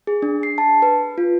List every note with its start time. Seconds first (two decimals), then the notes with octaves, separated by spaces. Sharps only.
0.07 G#4
0.22 D4
0.43 C7
0.58 A5
0.82 B4
1.18 F4